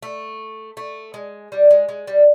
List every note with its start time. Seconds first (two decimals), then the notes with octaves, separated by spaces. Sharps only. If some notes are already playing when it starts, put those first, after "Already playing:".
0.03 A3
0.77 A3
1.14 G#3
1.52 G3
1.71 G#3
1.89 G#3
2.07 G3